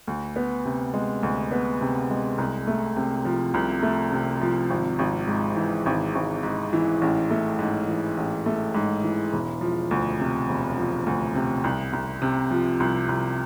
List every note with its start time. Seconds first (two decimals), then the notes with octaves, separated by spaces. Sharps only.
0.07 D2
0.36 B3
0.65 C3
0.94 G#3
1.23 D2
1.52 B3
1.81 C3
2.10 G#3
2.38 C2
2.67 A3
2.97 C3
3.25 F3
3.54 C2
3.83 A3
4.12 C3
4.41 F3
4.70 G#1
4.99 G#1
5.27 G#2
5.56 E3
5.86 G#1
6.15 G#1
6.43 G#2
6.73 E3
7.02 A1
7.30 A3
7.59 G#2
7.88 E3
8.17 A1
8.46 A3
8.75 G#2
9.04 E3
9.33 E1
9.61 F3
9.91 D2
10.20 C3
10.49 E1
10.78 F3
11.06 D2
11.35 C3
11.64 C2
11.93 C2
12.22 C3
12.51 F3
12.80 C2
13.09 C2